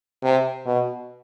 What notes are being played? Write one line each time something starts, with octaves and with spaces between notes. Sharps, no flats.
C3
B2